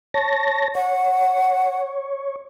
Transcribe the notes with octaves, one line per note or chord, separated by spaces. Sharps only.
C#5 A5 A#6
C#5 F#5